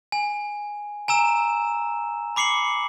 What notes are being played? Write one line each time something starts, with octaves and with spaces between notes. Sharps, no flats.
G#5
G#5 A#5 E6 E7
B5 D6 C7 C#7 F#7